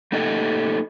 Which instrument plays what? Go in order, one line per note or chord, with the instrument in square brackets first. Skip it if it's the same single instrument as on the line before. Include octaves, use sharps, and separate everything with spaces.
[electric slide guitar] A3 A#3 D#4 G4 A4 D#5